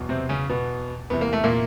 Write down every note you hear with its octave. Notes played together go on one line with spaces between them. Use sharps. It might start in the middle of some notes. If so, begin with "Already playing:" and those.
Already playing: E2 B2 F#3
C3 C4
C#3 C#4
B2 B3
E2 C3 E3 B3
A#3
A3
A#2 A#3